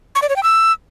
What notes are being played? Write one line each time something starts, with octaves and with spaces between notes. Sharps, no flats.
C#6
D5
C#5
G5
E6